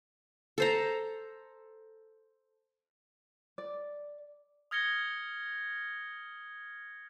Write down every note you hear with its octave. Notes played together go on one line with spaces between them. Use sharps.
A4 C5 A#5
D5
D#6 F6 G#6 A#6 C#7 G7